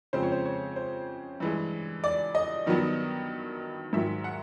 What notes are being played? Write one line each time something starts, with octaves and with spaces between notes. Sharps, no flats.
F2 C#3 F3 G#3 C4 C5
C#5
C5
C#5
C5
G2 E3 G#3
D5
D#5
G2 D#3 F#3 B3
G#2 D#3 F#3 E5
F#5